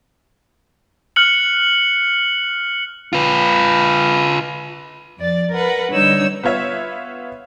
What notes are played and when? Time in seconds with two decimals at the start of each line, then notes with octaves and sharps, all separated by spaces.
1.16 F6 F#6 C#7 F#7
3.13 F4 B4
5.18 F2 D5 A6
5.51 A#4 B4 F#5
5.90 D3 G3 D#4 C#5 E6 G6
6.44 B3 F4 C#5 E5